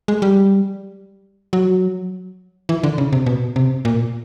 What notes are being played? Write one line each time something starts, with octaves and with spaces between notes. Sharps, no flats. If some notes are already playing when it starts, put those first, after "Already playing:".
G#3
G3
F#3
E3
D3
C#3
C3
B2
C3
A#2